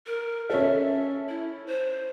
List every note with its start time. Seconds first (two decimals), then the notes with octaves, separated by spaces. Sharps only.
0.06 A#4
0.50 C#4 A4 E5
1.29 E4
1.66 C5